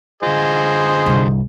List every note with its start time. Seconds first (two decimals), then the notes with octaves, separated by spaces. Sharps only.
0.23 D3 F4 G#4 C5 D#5
1.06 G1 C2